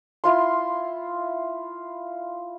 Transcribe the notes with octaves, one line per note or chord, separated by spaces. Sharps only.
E4 F4 C6